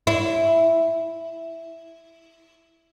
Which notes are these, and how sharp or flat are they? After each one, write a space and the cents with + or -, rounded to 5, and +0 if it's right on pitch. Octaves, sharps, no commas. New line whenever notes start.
E4 +0